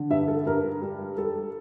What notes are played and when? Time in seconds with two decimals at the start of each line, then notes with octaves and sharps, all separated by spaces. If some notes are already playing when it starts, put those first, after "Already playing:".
Already playing: D3
0.10 G2 E5
0.28 A4
0.46 G2 A#4
0.82 G3
1.17 G3 A4